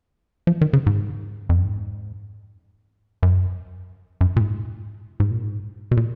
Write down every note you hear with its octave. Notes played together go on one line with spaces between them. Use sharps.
F3
D#3
C#3
G#2
F2
F#2
G#2
F#2
F#2
A#2
G#2
G#2
A#2
G#2
B2
A#2